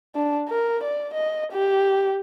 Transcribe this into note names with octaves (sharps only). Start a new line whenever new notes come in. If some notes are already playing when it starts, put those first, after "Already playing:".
D4
A#4
D5
D#5
G4